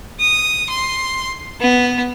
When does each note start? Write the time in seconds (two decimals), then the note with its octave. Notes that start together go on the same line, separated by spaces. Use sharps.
0.20 D#6
0.70 C6
1.61 B3